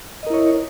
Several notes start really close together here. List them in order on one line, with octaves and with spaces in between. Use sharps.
D#5 A#4 E4 C#5